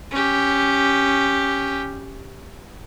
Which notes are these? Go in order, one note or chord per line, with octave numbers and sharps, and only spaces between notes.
C#4 G4